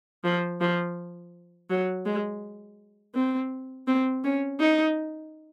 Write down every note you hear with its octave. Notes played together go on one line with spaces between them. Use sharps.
F3
F3
F#3
G#3
C4
C4
C#4
D#4